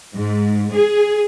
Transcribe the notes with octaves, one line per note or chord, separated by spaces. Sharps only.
G#2
G#4